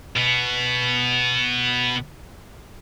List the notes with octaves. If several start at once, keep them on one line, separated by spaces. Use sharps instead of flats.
B2 B3